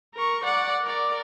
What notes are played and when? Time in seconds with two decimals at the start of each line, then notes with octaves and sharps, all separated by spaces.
0.15 A#4 C#6
0.44 D5 F#5
0.84 A#4 D5